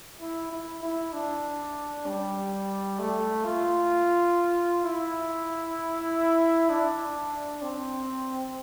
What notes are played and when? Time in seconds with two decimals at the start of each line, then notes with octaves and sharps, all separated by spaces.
0.21 E4
0.51 E4
0.83 E4
1.13 D4
2.06 G3
2.99 A3
3.44 F4
4.84 E4
6.69 D4
7.62 C4